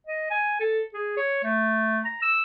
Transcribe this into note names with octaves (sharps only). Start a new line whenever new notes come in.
D#5
G#5
A4
G#4
C#5
A3
A#5
E6